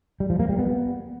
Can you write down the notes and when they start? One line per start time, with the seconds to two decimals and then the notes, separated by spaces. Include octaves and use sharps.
0.20 G3
0.30 F3
0.39 A#3
0.49 G3
0.59 B3